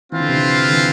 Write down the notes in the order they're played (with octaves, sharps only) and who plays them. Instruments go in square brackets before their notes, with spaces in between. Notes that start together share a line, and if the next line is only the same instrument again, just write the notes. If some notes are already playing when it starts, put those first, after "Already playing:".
[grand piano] E3 [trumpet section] C4 F4 B4 F5
[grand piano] D3
C3
D3
D3
E3